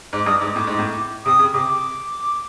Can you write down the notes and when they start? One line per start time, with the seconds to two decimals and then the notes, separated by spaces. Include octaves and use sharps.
0.13 G#2 D6
0.26 G2 D#6
0.39 G#2 D6
0.56 A2
0.67 G#2
0.79 A2
1.25 C3 D#6
1.39 C#3
1.53 C3 D6